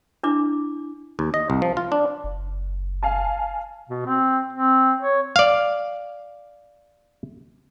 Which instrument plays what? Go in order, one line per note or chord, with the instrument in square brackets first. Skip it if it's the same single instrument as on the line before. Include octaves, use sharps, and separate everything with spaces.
[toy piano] D4 E4 D6
[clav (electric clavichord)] D#2
D#5
C2
F3
F4
D4
[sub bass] F#1
[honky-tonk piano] F5 G#5 A5
[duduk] B2
C4
C4
C#5
[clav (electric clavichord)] D5 F5